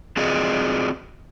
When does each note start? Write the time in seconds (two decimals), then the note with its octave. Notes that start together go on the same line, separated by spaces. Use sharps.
0.17 C4 F4 F#4 G#4 D5 D#5